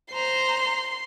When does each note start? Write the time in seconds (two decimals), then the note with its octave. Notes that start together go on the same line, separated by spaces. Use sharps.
0.13 C5 A#5 C6